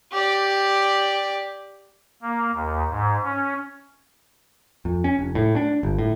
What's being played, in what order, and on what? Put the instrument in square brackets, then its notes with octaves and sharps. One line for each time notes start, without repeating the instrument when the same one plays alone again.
[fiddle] G4 D5
[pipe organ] A#3
D#2
G#2
C#4
[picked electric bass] F2
C#4
F1
A2
D4
G1
A2